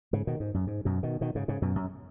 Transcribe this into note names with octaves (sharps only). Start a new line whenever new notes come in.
G#2 C#3
B2 D#3
G#2
F#2
G#2
F#2 B2
B2 D#3
B2 D#3
G#2 C#3
G#2 C#3
F#2 B2
F#2